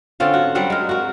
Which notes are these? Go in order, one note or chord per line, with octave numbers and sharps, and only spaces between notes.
D3 C4 C#4 F4
F#4
F#3 G3 C4 F#5
G#3 A#4
F#4 A#4